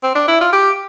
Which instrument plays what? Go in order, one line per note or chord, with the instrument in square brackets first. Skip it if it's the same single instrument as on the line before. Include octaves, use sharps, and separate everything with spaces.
[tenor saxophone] C4
D4
E4
F4
G4